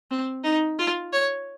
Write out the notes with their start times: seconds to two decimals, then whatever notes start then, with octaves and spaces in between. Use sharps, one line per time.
0.11 C4
0.44 D#4
0.79 F4
1.13 C#5